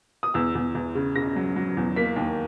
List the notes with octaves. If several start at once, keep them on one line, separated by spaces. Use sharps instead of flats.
D#6
E2 E6
E2
E2
C#3
C#3 A#6
F#3
F#3
E2
A#3 B6
D#2